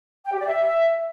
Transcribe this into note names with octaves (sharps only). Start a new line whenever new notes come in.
G5
G4
D5
E5